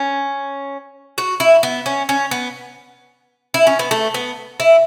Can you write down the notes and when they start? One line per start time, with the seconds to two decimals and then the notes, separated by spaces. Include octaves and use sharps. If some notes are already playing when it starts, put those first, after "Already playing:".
Already playing: C#4
1.18 F#4
1.40 E4
1.63 B3
1.86 C#4
2.09 C#4
2.31 B3
3.54 E4
3.67 C#4
3.79 B3
3.91 A3
4.14 B3
4.60 E4